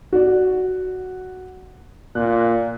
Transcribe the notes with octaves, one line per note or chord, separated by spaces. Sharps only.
F#4 D5
A#2 F#6